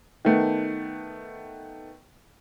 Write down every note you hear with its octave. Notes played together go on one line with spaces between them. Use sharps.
D#3 A3 B3